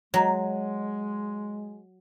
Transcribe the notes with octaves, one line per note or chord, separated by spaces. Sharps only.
F#3 G#3